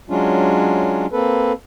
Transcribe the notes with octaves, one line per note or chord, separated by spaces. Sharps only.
F#3 G#3 C#4 D4 F4
A#3 C4 A4 B4